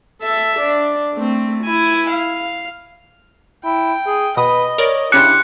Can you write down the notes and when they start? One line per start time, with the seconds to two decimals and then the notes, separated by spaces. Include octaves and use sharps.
0.22 A4 E5
0.59 D4
1.14 A3 C4
1.63 E4 G#5
2.10 F5
3.64 E4 G5
4.06 G#4
4.37 B2 B4 D#5 D#6
4.78 A#4 C#5 D5
5.12 C#3 C#4 D4 E4 G4 C6 F#6 C#7